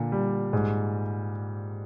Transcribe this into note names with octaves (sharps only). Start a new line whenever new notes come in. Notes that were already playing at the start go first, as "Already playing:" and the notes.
Already playing: A#2 D3
G3
G#2